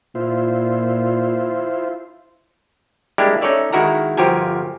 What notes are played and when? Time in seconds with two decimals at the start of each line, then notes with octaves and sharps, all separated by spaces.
0.15 A#2 E4 F4 C5
3.18 G3 G#3 A#3 D4 E4 G4
3.41 C#4 D#4 A4 C#5 D5 E5
3.72 D#3 G#3 E4 F#4 A#4 A#5
4.17 G1 F3 F#4 G4 A#4 G#5